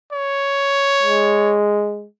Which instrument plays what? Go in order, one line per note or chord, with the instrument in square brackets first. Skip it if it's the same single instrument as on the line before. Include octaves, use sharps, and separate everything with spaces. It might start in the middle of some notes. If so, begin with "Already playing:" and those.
[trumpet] C#5
[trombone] G#3